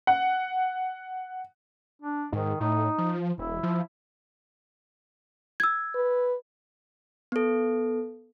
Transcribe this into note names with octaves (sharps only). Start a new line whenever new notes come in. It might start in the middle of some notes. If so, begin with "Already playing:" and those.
F#5
D4
G#2 D#3
A2 D#4
F3
E1 E4
F3
E6 G#6
B4
B3 A4